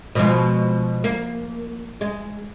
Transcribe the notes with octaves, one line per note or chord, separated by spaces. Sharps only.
B2 F3 G#3
A#3
G#3